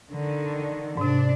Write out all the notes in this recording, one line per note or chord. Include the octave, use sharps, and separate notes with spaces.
D3 D#3
G#2 C3 D4